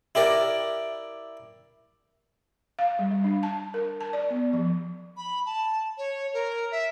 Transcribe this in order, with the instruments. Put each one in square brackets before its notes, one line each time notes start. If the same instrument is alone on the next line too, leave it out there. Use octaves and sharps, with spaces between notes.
[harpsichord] E4 G4 A#4 D5
[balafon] F5
G3
G3
D4
A5
A#4
A5
D5
B3
F3
[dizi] B5
A5
C#5
A#4
E5